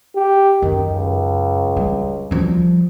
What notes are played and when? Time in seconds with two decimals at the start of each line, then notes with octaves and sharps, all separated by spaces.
0.16 G4
0.62 F#2 D#3
0.91 C#2
1.76 G3
2.31 F3 G3